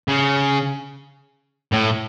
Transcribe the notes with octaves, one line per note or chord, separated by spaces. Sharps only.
C#3
A2